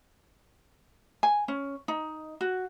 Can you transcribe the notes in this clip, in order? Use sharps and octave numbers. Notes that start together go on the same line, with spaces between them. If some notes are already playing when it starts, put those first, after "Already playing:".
G#5
C#4
D#4
F#4